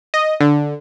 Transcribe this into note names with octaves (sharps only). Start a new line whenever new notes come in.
D#5
D3